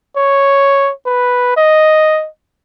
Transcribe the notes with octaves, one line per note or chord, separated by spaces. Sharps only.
C#5
B4
D#5